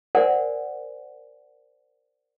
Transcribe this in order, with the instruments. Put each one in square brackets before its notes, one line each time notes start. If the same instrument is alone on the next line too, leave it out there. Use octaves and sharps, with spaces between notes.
[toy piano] A#4 C5 D5 F#5 G#5